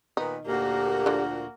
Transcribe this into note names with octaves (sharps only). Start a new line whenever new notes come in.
A#2 D#3 B3 D#4
D2 A#2 A#3 F#4 G4
D3 F3